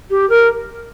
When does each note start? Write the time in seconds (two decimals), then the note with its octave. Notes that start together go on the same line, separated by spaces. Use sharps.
0.10 G4
0.29 A#4